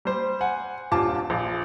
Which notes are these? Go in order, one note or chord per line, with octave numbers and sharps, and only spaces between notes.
G3 C5
F#5 G#5
D#1 G2 F4 G#5 A5 D6
A#1